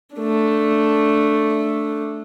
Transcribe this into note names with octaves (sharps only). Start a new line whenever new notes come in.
A3 D4